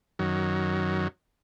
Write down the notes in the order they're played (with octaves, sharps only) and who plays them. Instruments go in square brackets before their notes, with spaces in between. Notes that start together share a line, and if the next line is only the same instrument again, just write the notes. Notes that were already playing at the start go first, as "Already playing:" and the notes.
[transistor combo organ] F#2 D#3 F#3